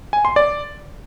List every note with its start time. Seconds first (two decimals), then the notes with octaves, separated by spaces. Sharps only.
0.13 G#5
0.25 C6
0.36 D5